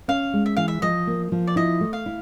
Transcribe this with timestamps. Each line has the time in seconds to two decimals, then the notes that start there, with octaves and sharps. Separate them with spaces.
0.08 C#4 F5
0.33 G#3
0.46 E5
0.57 E3 F5
0.68 E5
0.82 F3 D#5
1.07 A#3
1.32 F3
1.47 D5
1.56 E4 D#5
1.81 A3
1.93 F5
2.06 E4